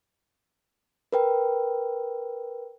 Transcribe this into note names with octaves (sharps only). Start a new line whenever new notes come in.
A#4 B4 G5